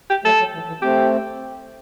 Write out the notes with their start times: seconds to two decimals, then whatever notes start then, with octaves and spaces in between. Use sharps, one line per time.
0.10 G4
0.24 F#3 A3 A4
0.39 F#3
0.54 E3
0.68 E3
0.82 A3 C4 G4